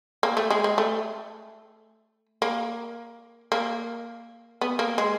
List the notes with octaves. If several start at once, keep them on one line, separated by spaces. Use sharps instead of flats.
A#3
A3
G#3
G#3
A3
A#3
A#3
B3
A#3
G#3